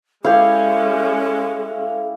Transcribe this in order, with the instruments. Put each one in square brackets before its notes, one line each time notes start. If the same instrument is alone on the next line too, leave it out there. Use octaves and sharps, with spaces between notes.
[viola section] G#3 C#4 [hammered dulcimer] E4 G4 [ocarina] A4 [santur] F5